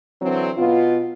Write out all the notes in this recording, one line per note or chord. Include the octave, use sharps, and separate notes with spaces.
D3 E3 F#3 C4
B2 B3 F4